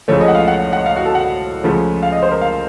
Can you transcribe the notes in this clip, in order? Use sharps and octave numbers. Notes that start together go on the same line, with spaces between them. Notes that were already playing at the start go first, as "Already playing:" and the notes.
C#2 C#3 F3 A3 C#5
D#5
F#5
F5
F#5
F#5
F5
F#4
A4
F#5
C#2 C#3 F3 A3
F5
D#5
C5
A#4
F5